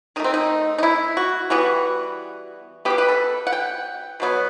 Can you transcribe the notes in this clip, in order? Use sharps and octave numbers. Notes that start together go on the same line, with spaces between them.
D#3 A3 D#4
C4
D#4
D#4
E4
F#4
E3 G3 B3 F#4
F#3 B3 G4
B2
B4
A4
F#5
G5
B2 F#3 B3